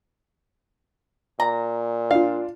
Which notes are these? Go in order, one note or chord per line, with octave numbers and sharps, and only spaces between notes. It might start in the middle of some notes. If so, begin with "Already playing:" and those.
A#2 A#5
D4 F4 F5